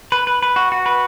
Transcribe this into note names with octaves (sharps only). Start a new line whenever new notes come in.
B4
B4
B4
F#4
F#4
B4